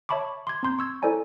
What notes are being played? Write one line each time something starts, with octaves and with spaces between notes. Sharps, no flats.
C#5 E5 A5 B5 C#6 D6
C6 D6 G#6
C4 A#5 C6 G6
C#6 E6 G#6
E4 A4 C5 D5 G#5 A#5